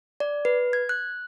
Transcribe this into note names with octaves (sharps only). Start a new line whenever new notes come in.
D5
B4
G#6
F#6